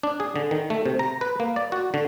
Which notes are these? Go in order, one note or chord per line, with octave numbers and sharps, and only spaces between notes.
D4
G#4
D3
D#3
A3
C3
A#5
B4
A#3
D5
F#4
D3